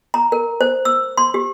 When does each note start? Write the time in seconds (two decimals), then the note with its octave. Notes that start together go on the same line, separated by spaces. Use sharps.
0.14 A#5
0.32 A#4
0.61 C5
0.85 E6
1.18 C6
1.34 G4